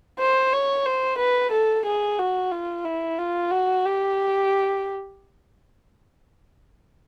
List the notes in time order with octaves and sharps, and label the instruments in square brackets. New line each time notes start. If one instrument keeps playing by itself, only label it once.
[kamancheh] C5
C#5
C5
B4
A4
G#4
F#4
F4
E4
F4
F#4
G4